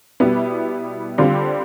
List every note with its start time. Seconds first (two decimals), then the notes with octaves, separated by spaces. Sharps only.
0.20 B2 G3 B3 E4
1.18 D3 G3 C4 F4